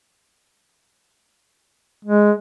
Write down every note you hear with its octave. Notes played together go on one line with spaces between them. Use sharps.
G#3